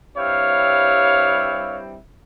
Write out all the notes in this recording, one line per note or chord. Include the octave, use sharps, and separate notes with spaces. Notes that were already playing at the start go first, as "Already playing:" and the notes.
G2 G3 C4 E4 C#5 F5